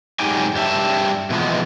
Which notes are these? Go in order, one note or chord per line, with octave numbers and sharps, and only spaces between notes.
G#2 F#3 D#4 G4 G5 G#5
G2 G4 E5 A5
B2 E3 F3 G#3 B3